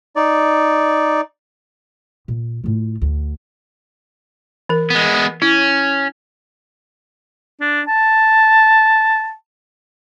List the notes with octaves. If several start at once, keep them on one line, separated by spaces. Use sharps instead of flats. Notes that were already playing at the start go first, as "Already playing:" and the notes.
D#4 D5
A#2
A2 F4
D2
E3 A#4
G#3 B3
C#4 E4
D4
A5